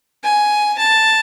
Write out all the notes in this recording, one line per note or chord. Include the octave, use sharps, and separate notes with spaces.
G#5
A5